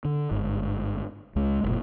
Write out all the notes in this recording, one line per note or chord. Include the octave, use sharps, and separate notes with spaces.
D3
G1 G#2
C#2 G#3
F#1 B1 A#2